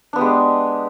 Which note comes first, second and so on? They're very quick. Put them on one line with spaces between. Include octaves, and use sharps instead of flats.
D4 B3 G4 G#3